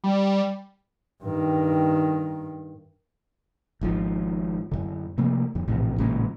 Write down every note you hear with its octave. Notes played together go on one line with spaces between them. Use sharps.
G3
G2 D#3
G#1 G#2 F3
F#2 D3
C3 F3 A3 A#3
F2 D3
A#1 A2 C3 E3
A1 A#2 C#3 G#3